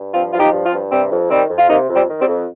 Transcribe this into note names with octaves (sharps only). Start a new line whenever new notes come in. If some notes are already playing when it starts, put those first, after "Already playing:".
Already playing: G2
F3 C4 F4
F3 F4
D#4 G4
G2
C4 F4
G2
C3 G3 C4
F2
D#3 G3 C4
F2
F4
C3 A#3 D#4
F2
G3 C4
D#3
G3 C4
F2